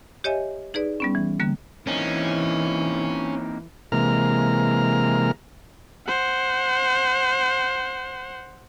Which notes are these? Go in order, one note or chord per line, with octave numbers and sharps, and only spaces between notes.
G4 C#5 D#5 E5 G#5
D#4 G#4 B4 D5
G3 B3 C#4
E3
D3 G3 A#3
E3 A#3 C4 C#4 D#4
C3 E3 G#3 A#3 A#5 F6
C5 F#5